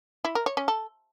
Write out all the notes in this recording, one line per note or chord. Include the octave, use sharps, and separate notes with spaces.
E4
A#4
C#5
C#4
A4